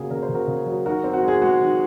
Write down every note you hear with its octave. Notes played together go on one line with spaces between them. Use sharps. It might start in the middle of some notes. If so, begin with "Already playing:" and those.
Already playing: C#3 A#3 F#4 G#4
C#3 A#4
C5
C#3
F#4 A#4
C#3
F#3
D#3 F#4 A#4
C4
F#4
G#3 G#4
G#3 F#4
D#3